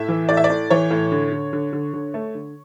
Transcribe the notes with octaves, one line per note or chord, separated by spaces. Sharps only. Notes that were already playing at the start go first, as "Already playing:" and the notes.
Already playing: A2 E5
E3
A2 D5
E5
D5
A2
E3 C#5
A2
D3
D3
D3
D3
D3
A3
D3